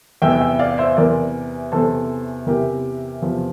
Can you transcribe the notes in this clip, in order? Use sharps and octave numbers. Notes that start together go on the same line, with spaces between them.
E2 C3 E3 E5 G5
E5 G5
D5 F5
C5 E5
E2 C3 E3 A#4 D5
E2 C3 E3 A4 C5
E2 C3 E3 G4 A#4
E2 C3 F3